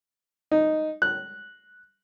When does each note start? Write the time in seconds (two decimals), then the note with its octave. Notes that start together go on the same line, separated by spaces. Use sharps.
0.52 D#4
1.02 F#6